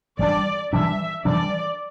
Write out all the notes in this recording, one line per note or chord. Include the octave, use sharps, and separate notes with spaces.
E3 G3 D4 D5
E3 G3 D4 E5
E3 G3 D4 D5